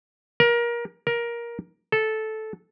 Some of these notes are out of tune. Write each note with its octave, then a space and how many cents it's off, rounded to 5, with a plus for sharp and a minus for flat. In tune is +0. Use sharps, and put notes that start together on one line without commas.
A#4 +25
A#4 +15
A4 -10